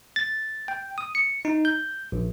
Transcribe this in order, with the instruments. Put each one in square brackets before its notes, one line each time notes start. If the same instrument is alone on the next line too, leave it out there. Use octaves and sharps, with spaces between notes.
[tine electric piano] A6
G5
D#6
C#7
D#4
G6
A#1